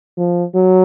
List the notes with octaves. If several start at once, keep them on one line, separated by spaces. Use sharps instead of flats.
F3
F#3